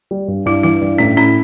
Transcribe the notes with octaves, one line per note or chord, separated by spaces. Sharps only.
G3
G2
G2 E4
E3 E4
G2
A2 C#4
C#4 E4